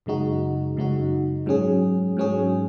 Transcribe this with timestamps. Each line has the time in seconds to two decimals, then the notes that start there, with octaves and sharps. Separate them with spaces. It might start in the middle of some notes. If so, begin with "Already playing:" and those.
0.06 F#2 C#3 G#3 D#4 F#4
0.77 F#2 C#3 G#3 D#4 F#4
1.46 G#2 F#3 C#4 G#4
2.17 G#2 F#3 C#4 G#4